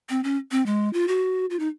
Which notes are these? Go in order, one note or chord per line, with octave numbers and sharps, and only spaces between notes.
C4
C#4
C4
G#3
F4
F#4
F4
D#4